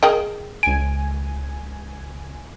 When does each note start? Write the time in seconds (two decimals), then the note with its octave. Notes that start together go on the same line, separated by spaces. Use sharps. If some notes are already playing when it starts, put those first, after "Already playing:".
0.03 G#4 A#4 D#5 G5
0.63 C#2 G#5 D7